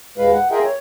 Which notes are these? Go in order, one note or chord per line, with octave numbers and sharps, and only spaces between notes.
D#2 A#2 G#3 B4 F5
F#5
F4 G#4 A#4 D#5 E5 G5
C#5